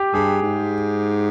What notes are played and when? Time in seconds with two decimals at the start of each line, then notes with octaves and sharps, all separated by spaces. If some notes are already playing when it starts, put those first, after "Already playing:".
Already playing: G4
0.14 G2 G#4
0.42 G#2